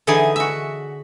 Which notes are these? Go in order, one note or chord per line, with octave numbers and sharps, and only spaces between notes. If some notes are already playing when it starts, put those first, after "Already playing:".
D3 E3 D#4 G#4 G#5
F#4 E5